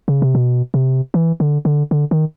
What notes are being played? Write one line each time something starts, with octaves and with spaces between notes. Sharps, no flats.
C#3
C3
B2
C3
E3
D3
D3
D3
D#3